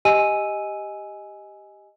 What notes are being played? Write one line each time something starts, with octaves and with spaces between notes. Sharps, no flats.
G4 D#5 G#5 E6 D#7